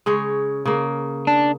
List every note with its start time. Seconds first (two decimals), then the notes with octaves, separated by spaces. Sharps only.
0.06 C#3 G#3 C#4
0.65 C#3 A#3
1.27 D4